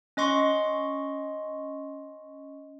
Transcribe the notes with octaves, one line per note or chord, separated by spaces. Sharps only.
C#4 D#5 C6 C#6